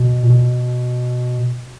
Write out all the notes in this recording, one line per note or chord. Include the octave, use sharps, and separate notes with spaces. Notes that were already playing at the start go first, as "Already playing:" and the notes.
Already playing: B2
A#2
B2